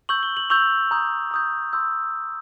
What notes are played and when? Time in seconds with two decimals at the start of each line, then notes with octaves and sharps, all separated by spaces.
0.09 C#6 E6 G6 F#7
0.23 G7
0.37 F#7
0.50 C#6 E6 G6 F7
0.91 A#5 D#6 G6
1.31 A#5 D#6 G6
1.73 C6 E6 G6